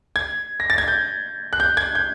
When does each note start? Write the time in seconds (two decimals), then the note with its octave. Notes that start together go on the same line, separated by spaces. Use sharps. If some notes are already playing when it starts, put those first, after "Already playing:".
0.16 G#6
0.60 A#6
0.70 A6
0.78 G#6
0.88 G6
1.53 F#6
1.60 G6
1.77 G#6
1.95 G6